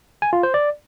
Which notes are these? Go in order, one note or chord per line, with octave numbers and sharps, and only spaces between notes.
G#5
F4
C5
D5